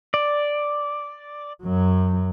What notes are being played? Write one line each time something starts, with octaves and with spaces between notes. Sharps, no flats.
D5
F#2 F#3